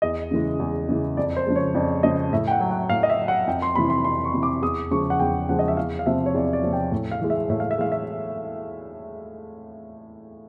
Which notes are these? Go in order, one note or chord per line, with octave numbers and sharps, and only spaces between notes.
E2 D#5
C#3 E3 G#3
E2
C#3 E3 G#3
F2 D5
C5
C#3 F3 G#3
C#5
F2 D5
C#3 F3 G#3 D#5
A2 E5
G5
F#5
F#3
F#5
A2 F5
D#5
E5
F#3
F#5
F2 G5
C6
C3 E3 B5
C6
F2 C6
C#6
C3 E3
D6
E2 D#6
C#3 F3 G#3 C#6
F#5
E2 G5
C#3 F3 G#3 F#5
D#5
E5
E2 F5
F5
C3 F3 E5
C#5
E2 D5
D5
C3 F3
G5
A2
F5
E3 G#3
E5
A2 E5
F5
E5
E3 G#3 F5
E5